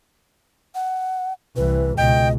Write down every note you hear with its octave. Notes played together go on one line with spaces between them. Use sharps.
F#5
C2 E3 B4
C#2 B2 D#5 G5